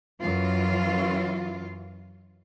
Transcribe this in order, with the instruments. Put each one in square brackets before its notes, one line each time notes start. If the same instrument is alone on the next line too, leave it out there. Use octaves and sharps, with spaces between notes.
[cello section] F#2 E3 F4